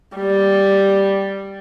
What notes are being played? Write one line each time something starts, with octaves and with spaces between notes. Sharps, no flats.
G3